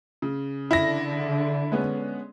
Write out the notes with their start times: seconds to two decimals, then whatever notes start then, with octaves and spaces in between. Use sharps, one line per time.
0.22 C#3
0.71 D3 E4 A#6
1.72 G#3 B3 C#4